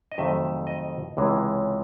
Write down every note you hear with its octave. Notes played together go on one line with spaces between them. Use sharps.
D#5
F2 C3 D#3 F#3 A3 E5
D#5
C#2 C3 E3 G#3